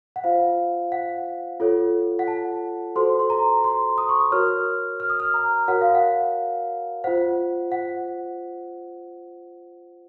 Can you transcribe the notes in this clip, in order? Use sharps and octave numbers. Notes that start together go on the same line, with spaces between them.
F#5
F4 C5 F5
F#5
F4 A4 C#5
F#5
A5
F#4 A4 C5 C6
C6
A#5
C6
D#6
C#6
D#6
F#4 A#4 C#5 F6
F6
D#6
F6
A#5
F#4 A#4 C#5 F#5
F5
F#5
F4 C5 F#5
F#5